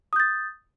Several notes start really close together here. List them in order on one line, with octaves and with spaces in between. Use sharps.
D#6 G6 A6